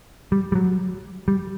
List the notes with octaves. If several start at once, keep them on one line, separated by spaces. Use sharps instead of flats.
G3
G3
F#3
G3